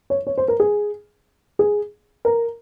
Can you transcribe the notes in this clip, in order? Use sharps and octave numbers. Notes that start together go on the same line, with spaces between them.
C#5
C#5
C5
A#4
G#4
G#4
A#4